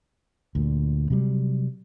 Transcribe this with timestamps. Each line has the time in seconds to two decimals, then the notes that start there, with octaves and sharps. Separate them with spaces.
0.55 D2 A#2
1.10 C3 F#3 G3